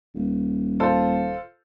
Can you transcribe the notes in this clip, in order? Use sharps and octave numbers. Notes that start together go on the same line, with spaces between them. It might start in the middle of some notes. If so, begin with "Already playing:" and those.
D#1
F4 A4 C5